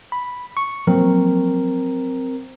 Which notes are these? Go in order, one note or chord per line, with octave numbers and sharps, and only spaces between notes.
B5
C#6
F3 F#3 A#3 C4 A#4